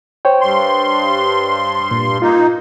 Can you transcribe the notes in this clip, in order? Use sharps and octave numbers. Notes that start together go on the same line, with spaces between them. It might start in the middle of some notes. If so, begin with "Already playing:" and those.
C5 C#5 G5
G2 C6
A#2
A#3 D#4 F4